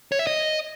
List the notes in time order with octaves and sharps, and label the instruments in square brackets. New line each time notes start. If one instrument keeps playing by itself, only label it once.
[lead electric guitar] C#5
E5
D#5